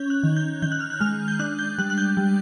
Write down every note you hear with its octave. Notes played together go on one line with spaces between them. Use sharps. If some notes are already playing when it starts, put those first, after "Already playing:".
Already playing: C#4 G6
F#6
D#3
G6
D#3 G6
F#6
F6
F#6
G#3 F6
G6
D4 F#6
G6
G3 F#6
F#6
G6
G3